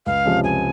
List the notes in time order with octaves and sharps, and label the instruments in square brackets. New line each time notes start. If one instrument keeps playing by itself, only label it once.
[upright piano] C#2 [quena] F5
[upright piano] C3 F3 G#3 C#4
[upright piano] C#2 [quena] G#5